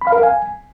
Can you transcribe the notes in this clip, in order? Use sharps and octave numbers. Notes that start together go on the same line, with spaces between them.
B5
F5
A#4
F5
G#5